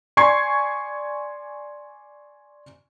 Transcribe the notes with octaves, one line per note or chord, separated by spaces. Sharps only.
D5 G#5 C6 C#6 G#6 C7